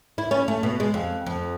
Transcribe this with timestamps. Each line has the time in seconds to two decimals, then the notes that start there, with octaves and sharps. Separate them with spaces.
0.18 E4
0.31 C#4
0.48 A3
0.63 B2
0.80 G#3
0.94 F2
1.26 F2